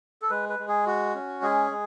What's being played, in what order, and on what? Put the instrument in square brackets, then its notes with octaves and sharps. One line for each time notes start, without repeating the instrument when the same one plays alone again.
[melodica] A4
G#3 B4
B4
G#3
G#4
F#4
C#4
G#3 G#4
G#3